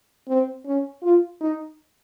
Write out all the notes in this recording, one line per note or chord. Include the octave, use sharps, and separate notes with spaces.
C4
C#4
F4
D#4